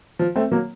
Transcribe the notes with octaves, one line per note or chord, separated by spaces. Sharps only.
F3
A3 C4
F#3 A#3